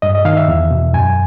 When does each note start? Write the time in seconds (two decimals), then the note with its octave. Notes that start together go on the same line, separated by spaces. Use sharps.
0.02 G2 D#5
0.15 D#5
0.25 D#3 F5
0.37 E5
0.48 E2
0.71 B2
0.93 F#2 G#5